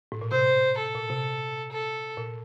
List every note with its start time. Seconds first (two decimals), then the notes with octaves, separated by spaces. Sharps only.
0.12 A2
0.22 A#2
0.32 C3 C5
0.78 A4
0.94 A#2
1.09 C3
1.72 A4
2.17 A#2